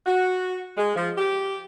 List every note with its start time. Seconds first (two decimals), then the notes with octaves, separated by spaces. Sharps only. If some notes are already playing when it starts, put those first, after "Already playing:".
0.06 F#4
0.77 G#3
0.96 F3
1.18 G4